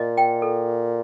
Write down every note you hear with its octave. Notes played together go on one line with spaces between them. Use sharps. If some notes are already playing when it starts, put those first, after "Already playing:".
Already playing: A#2 D#5
G5
A4